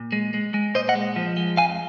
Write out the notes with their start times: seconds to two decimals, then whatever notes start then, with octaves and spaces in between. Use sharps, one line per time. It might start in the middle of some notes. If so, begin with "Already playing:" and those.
Already playing: A#2
0.12 G#3
0.34 G#3
0.54 G#3
0.74 A#2 C5 D#5
0.89 D#5 F#5
0.95 G#3
1.16 F3
1.37 G#3
1.57 F2 F5 G#5